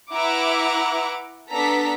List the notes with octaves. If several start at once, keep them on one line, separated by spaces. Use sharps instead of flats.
E4 B4 E5 F#5 A#5 D6
B3 D4 A4 A#5 B6